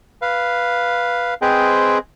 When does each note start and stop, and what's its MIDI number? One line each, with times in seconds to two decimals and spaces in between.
0.22 1.34 71
0.22 1.34 77
1.42 1.98 60
1.42 1.98 68
1.42 1.98 71
1.42 1.98 72
1.42 1.98 75
1.42 1.98 79